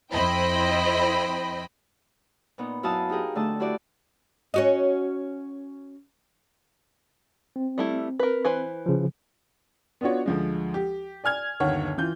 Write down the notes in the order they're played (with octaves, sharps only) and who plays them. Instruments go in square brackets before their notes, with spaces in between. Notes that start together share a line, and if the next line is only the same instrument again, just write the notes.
[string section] F2 E4 C5 D#5 G5 B5
[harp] A#2 B3 D#4
F#2 E4 F#4 F5 A5 D#6
D#4 G4 G#4 A#4
D3 A3 D4 D#5 A5 E6
D4 E4 F#4 G4 D5 E5
[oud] C#4 F#4 D#5
[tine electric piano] C4
[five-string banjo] G3 A3 E4
A#4 B4
E3 B4 C5
[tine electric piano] C#3 F3
[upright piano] B3 D4 F4 F#4 C#5
D2 F3 G#3
G4
D5 G#5 F6 G#6
G1 D#2 C#5 F#5
E3 F4 G6